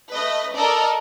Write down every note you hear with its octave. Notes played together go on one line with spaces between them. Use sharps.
A3 B4 D#5
A4 A#4 D5 D#5